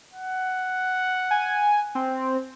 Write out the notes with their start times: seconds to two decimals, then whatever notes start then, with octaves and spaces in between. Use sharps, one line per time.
0.13 F#5
1.31 G#5
1.95 C4